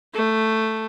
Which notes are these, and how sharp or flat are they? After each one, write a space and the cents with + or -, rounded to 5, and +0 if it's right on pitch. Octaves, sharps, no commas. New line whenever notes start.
A3 +5